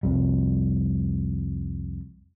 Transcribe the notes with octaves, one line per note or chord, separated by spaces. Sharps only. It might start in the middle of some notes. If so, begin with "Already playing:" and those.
C2 F2 G3